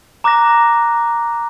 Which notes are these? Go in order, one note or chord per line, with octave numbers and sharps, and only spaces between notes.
A#5 D6 F#6 A#6